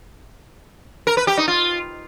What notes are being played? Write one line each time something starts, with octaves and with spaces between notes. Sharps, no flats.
A#4
B4
G4
D#4
F4